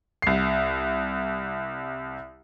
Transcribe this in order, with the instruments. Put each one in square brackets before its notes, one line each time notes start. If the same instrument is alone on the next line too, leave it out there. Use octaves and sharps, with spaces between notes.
[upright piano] C2 C7